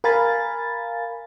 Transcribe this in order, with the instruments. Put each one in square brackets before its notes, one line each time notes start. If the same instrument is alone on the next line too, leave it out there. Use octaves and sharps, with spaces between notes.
[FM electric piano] A#4 F5 G#5 B5 A6